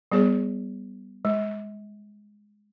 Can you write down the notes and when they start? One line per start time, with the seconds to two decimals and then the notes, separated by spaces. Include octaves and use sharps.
0.12 G3 B3 G#4 C#5
1.25 G#3